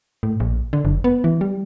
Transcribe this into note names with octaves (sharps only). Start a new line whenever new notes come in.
A2
A#1
D3
F#1
B3
E3
G3